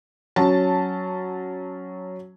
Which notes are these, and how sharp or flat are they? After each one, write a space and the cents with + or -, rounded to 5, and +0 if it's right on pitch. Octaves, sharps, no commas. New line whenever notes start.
F#3 +0 C#4 +0 A5 +0